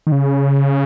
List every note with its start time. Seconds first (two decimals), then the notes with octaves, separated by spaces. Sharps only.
0.07 D#3
0.12 C#3